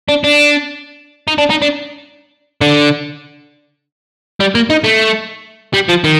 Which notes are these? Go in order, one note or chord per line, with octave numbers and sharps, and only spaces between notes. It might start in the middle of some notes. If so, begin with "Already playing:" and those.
D4
D4
D#4
D4
D#4
D4
D3
G3
A#3
D#4
A3
G3
F3
D#3